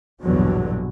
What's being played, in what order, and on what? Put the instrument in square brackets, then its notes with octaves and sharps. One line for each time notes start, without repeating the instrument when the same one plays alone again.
[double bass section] A#1 E2 G2 B2 D3 F#3